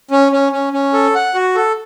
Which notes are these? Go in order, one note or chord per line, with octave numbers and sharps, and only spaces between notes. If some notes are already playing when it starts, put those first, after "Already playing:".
C#4
C#4
C#4
C#4
A4
F#5
F#4
A4